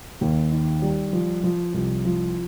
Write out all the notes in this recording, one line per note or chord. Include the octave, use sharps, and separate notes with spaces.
D#2
D#3
G3
F3
F3
C2
F3